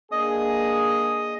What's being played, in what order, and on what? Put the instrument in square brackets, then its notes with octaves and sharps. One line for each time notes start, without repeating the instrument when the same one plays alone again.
[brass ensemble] A#3 D4 G#4 [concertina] D#5 D#6